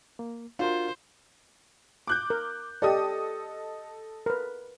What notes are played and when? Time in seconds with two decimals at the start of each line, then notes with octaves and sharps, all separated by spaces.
0.19 A#3
0.59 D4 F4 F#4 A#4 C5
2.07 D6 F#6 G6
2.30 A#4
2.82 G4 A4 D5 D#5 D#6
4.26 A#4 B4